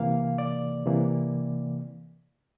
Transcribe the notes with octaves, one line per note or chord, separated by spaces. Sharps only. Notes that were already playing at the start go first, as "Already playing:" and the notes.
Already playing: C3 E3 A#3 F5
D5
C3 E3 A#3